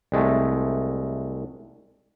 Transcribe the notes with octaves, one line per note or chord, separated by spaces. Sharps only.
C2 G#3 A3